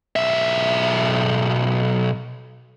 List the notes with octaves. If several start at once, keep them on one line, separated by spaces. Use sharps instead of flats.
B1 E5